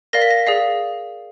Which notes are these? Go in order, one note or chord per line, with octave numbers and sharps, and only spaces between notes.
A#4 D5 F5 A#6
B6
A#6
G#4 D5 F5